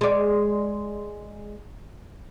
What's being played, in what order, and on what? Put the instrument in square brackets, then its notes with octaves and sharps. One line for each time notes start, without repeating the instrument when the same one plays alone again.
[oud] G#3 D5